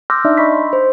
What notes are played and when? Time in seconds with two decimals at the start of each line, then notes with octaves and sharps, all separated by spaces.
0.10 C6 D6 E6 F6 G6 A#6
0.25 D4 D#4 D5 E5
0.37 D#5 B5 C#6 B6
0.52 C6
0.73 C5